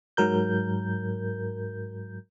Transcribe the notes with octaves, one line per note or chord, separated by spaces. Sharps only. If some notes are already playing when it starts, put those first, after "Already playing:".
G#2 F#3 A#4 G6